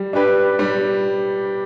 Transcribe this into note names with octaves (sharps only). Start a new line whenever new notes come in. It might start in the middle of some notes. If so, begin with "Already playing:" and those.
Already playing: G3
D4 G4 B4
G3